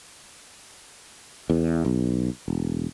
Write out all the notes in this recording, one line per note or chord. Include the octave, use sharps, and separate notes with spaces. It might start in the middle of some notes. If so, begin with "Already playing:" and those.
E2
B1
E1